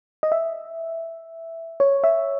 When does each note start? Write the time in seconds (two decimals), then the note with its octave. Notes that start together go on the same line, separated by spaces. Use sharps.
0.23 D#5
0.32 E5
1.80 C#5
2.04 E5